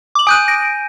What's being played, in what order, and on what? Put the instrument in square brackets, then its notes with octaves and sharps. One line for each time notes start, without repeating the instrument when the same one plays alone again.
[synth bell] D6 F#7
[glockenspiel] G#5 G6 D#7 [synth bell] D#6 F#6
[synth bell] A#6 D7